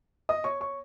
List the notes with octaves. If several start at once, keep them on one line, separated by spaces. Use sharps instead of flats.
D#5 D#6
C#5 C#6
C#5 C#6